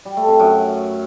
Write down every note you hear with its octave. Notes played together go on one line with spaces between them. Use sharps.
G3
A3
C3
F#2